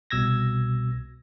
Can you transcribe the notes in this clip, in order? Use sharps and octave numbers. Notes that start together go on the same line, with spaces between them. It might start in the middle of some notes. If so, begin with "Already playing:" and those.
C2 B2 E6 G#6 A#6